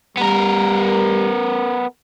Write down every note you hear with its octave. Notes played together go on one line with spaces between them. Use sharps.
G3 B3 A#4